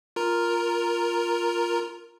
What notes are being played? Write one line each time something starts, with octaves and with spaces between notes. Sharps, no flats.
F4 A#4 A#5